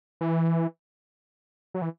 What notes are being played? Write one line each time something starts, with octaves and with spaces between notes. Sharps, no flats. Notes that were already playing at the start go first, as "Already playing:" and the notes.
E3
F#3
E3